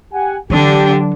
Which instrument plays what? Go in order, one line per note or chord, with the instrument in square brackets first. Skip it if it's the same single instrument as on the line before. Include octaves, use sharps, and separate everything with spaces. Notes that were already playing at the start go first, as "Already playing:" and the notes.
[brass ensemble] G4 F#5 G#5
[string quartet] D3 D4 [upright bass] E3 F#3 [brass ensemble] G4